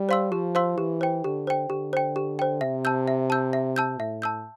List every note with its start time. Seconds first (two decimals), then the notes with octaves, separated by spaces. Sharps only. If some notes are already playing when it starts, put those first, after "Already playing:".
Already playing: G3
0.09 C5 F5 C6 E6
0.32 F3 G4
0.55 C5 F5 C6 E6
0.77 E3 G4
1.01 C5 G5
1.24 D3 G4
1.47 C5 G5
1.70 D3 G4
1.93 C5 G5
2.16 G4
2.39 C5 G5
2.61 C3 E5
2.85 A5 E6 G6
3.08 E5
3.30 A5 E6 G6
3.53 E5
3.76 A5 E6 G6
3.99 A2 E5
4.22 A5 E6 G6